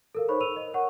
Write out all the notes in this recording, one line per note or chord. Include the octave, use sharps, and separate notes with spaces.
A4 A#4 F5
D#4 C5 C#5 B5 C#6
E6 D#7 F7
D#5
A#4 C#5 F#5 C#6